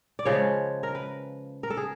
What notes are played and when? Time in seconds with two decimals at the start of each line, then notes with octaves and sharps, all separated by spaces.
0.19 D5
0.25 C#3 F3 G#3 C#5
0.83 A#4
0.95 B4
1.63 A#4
1.70 A4
1.77 G#4